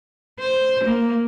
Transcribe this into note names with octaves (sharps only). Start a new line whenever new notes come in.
C5
A#3